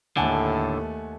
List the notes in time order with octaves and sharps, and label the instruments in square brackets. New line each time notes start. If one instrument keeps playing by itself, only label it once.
[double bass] D#2 A3 [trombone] A2 [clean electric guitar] D3 [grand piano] F#5 G#5 A5